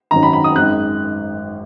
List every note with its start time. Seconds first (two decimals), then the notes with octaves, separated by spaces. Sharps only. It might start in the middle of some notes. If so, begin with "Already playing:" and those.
0.11 G#1 F#2 D#3 F#3 A#5
0.23 B5
0.33 B5
0.44 D#6
0.56 G#1 F#2 D#3 G#3 F#6